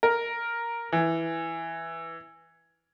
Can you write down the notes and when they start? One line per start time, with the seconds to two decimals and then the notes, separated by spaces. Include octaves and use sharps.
0.03 A#4
0.92 E3